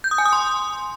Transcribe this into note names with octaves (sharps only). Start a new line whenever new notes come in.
G6
D#6
G#5
D#6
C6